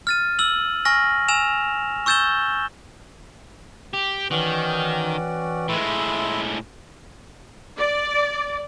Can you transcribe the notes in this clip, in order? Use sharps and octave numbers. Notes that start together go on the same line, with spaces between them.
F6 A6 D#7
E6 F#7
G#5 C#6 F6 A#6
G#5 E6 E7 F7
C#6 E6 G6 A6 E7 G7
G4
D#3 E3 C#4 F#4 B4 D5 G5
A2 G#3 E5 B5 C6
D5